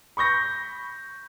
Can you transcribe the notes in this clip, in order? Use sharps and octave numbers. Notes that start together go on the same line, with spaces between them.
B5 C#6 G6 A#6